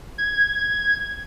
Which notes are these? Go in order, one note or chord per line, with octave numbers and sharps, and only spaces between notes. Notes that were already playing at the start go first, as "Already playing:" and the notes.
G#6